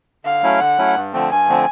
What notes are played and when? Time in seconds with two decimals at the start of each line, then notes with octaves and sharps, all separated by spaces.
0.25 D3 F5
0.43 F#3 A3 C#4 E4
0.60 D3 F#5
0.78 F#3 A3 C#4 E4
0.95 G2
1.13 D3 F3 A3 C4
1.30 G2 G#5
1.48 D3 F3 A3 C4